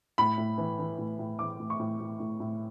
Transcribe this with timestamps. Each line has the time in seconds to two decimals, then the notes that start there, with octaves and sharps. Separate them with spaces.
0.18 A2 B5
0.38 A2
0.58 E3
0.79 E3
0.98 A2
1.19 A2
1.39 E3 D6
1.60 A2
1.70 C#6
1.80 A2
2.00 A2
2.20 A2
2.40 A2